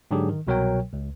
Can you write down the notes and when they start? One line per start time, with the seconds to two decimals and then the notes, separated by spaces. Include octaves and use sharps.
0.11 G#2 D3 F#3 D4 G4 G#4
0.29 D#3
0.47 C2 B2 F#3 A#4 C#5 G5
0.93 C#2